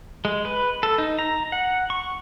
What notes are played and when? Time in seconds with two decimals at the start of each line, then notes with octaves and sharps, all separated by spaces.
0.25 G#3
0.45 B4
0.83 A4
0.98 D#4
1.19 A#5
1.52 F#5
1.90 C#6